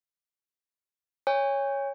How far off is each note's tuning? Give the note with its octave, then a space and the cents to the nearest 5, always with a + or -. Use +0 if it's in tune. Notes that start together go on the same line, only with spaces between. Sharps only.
C#5 +0 G#5 -35